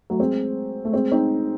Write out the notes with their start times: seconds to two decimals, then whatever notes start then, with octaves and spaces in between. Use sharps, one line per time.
0.10 F#3 A3
0.19 G#3 C4
0.85 A3
0.93 G#3 C4
1.12 C4 D#4